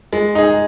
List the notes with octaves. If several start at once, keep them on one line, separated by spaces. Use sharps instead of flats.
G#3
D#4 G#4